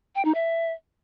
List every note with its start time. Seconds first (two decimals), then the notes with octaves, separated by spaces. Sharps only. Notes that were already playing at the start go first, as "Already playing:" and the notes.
0.15 G5
0.25 D#4
0.35 E5